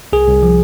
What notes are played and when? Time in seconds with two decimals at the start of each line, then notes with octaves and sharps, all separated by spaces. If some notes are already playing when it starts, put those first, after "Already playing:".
0.13 C2 G#4
0.27 C2
0.43 F3